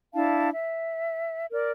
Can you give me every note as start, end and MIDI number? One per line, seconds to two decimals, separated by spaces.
0.14 0.49 62
0.14 0.49 64
0.14 0.49 77
0.14 0.49 81
0.52 1.47 76
1.51 1.71 70
1.51 1.71 74